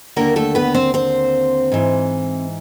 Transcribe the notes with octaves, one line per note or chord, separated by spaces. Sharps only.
D#2 D3 A#3 A#4
A3 A4
B3 B4
C4 C5
C4 C5
G#2 E3